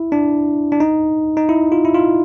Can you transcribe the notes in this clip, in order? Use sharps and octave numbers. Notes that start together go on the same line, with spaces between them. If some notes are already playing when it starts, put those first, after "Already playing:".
Already playing: E4
D4
D4
D#4
D#4
E4
F4
E4
F4